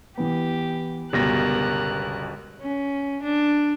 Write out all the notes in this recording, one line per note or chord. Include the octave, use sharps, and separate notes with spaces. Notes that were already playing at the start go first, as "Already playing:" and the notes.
E3 B3 G4
G1 C#2 B2 G3 A#4 F#6 A#6
C#4
D4